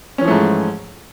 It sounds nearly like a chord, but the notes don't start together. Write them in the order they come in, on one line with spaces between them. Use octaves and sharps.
C#4 E3 F3 A3 G#2